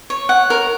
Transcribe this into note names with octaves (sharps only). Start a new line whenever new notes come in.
C#5
F#5
A#4